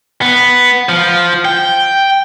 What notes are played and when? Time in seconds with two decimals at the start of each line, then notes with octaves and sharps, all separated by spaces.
0.22 B3
0.89 F3
1.45 G5